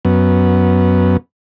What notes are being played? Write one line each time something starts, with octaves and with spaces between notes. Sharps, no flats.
F#2 B3